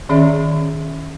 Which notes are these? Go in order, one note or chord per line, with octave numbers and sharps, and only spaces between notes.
D#3 C#4 G#4 D5 E5 A#5